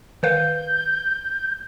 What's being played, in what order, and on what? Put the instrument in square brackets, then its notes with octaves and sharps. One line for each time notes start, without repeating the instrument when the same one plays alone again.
[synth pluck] D#3 B4 F5 [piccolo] G6